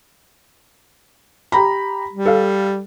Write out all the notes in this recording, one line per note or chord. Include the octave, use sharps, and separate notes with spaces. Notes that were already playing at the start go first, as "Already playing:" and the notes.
G4 A#5 B5
G3
A4 F5